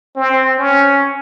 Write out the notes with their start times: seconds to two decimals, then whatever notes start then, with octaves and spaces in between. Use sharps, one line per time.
0.16 C4
0.58 C#4